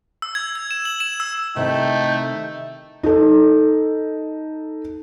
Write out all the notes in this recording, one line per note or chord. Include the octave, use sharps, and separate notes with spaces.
E6
G#6
G#6
E7
F#7
E7
E6
C3 D#3 A3 D#4 E4 G5
D#4 A4